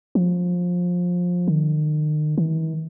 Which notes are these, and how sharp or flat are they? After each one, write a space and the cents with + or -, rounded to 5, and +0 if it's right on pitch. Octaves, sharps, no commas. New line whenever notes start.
F3 +20
D#3 -40
E3 -45